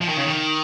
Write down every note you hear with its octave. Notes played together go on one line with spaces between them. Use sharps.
F3
D#3
C#3
D#3